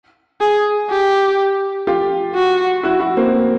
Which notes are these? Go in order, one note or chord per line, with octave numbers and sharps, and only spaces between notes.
G#4
G4
F4 G4
F#4
E4 F#4
E4 F#4
A#3 C4